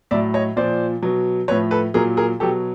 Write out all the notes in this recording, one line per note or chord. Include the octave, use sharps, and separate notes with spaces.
A2 F#3 D5 E5
C#5 D#5
A#2 F3 C5 D5
B2 F#3
A2 F3 B4 C#5
A4 B4
A#2 F#3 G#4 A#4
G#4 A#4
B2 F#3 G4 A4